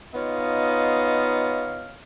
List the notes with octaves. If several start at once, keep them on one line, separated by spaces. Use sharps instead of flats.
B3 D#4 F4 C#5 D#5 F5